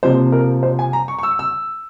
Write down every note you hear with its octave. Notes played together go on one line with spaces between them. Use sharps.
C3 F3 A#3 C5
A#4
C5
G#5
A#5
C#6
C#6
E6
E6